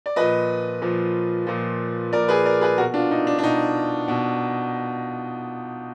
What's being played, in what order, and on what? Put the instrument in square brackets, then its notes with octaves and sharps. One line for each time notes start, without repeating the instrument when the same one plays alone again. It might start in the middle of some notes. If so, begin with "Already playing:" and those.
[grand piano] D5
A#2 F3 B4 D#5
A#2 F3
A#2 F3
A#2 F3 A#4 D5
G#4 B4
A#4 D5
G#4 B4
B2 F#4 A#4
D4 F4
D#4
D4
D4
B2 D#4
B2